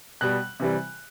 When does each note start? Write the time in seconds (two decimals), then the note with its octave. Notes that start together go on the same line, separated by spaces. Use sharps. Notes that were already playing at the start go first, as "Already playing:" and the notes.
0.21 B2 G3 F#6
0.60 C3 E3 G3